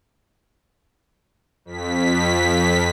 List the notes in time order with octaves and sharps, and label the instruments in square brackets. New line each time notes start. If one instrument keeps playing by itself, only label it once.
[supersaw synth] F2 B6